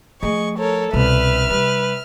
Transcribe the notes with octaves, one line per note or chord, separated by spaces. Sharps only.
F3 A3 G#4 D#5 C#6
A4 A#4 C#5
C2 B2 B4 E5 F6
C3 G3 B4